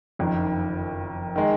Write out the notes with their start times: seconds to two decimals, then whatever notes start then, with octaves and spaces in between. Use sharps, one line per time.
0.19 F#1 F2 D#3
1.36 D#3 G#3